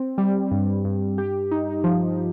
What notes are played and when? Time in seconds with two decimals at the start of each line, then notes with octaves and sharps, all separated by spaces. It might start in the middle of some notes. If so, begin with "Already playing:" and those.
Already playing: C4
0.18 G3
0.51 G2
0.85 G2
1.18 G4
1.52 D#4
1.84 F3